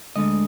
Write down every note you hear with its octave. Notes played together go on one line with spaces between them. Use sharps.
D2 D3 G#3 D#5